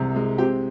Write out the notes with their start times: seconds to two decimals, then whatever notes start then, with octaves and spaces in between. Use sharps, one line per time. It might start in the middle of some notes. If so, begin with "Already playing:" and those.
Already playing: C2 C3 G#3
0.16 G#3
0.38 C4 G4